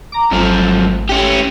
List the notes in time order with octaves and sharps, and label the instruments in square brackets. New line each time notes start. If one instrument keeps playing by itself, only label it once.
[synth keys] A#5 D6
[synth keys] G#1 A3 [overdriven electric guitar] F#2 F3
[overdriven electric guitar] C#4 G4